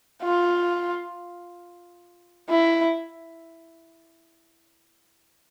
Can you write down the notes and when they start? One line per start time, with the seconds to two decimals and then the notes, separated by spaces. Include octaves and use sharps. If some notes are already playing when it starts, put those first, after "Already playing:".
0.23 F4
2.50 E4